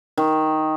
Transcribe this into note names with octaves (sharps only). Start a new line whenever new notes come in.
D#3